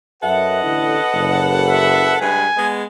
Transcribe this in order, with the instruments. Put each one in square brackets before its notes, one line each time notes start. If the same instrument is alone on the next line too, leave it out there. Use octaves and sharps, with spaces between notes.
[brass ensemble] F#2 E5 [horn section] A4 B4 F#5 [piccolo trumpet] D#5
[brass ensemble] A1 D3 E4
F#1
[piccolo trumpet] E5
[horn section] G2 G#3 B4 [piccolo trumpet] G#5
[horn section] G#3 B3